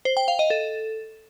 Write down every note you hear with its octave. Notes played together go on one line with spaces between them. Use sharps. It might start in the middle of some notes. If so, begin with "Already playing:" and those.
C5
G5
F5
D#5
A4